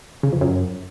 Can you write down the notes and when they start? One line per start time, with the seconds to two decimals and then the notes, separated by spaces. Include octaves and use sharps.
0.23 C#3
0.32 F2
0.41 F#2